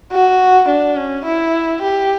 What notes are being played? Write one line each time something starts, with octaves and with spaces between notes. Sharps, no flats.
F#4
D4
C#4
E4
G4